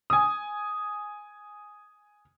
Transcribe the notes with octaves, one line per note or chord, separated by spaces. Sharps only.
G#5 D#6